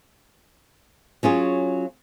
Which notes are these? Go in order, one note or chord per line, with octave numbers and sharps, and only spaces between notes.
F#3 C#4 F4 G#4